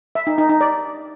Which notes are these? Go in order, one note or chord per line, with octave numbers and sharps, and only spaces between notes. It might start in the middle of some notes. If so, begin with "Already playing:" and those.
E5
D#4
D#4
D#4
D5